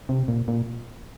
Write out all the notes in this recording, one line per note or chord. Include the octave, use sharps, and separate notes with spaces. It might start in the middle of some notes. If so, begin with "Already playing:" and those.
C3
A#2
A#2